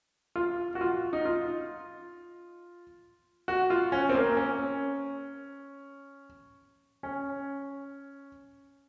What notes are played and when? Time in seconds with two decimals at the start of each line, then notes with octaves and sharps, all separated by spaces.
0.36 F4
0.75 F#4
0.81 F4
1.13 D#4
1.25 F4
3.48 F#4
3.70 F4
3.92 C#4
4.09 C4
4.15 A#3
4.37 C#4
7.03 C#4